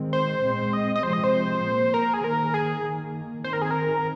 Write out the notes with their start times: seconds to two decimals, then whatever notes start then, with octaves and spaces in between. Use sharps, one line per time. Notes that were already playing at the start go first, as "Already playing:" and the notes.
Already playing: D#3 G#3 C4
0.13 C5
0.43 A#2 G#3 C4
0.73 D#5
0.95 D#5
1.03 C3 F3 G#3 C4 C5
1.13 D#5
1.24 C5
1.63 A#2 A#3
1.94 A#4
2.14 G#4
2.24 D#3 A#3 A#4
2.54 G#4
2.85 D#3 A#3
3.44 D#3 C4 C5
3.53 A#4
3.62 G#4
3.71 A#4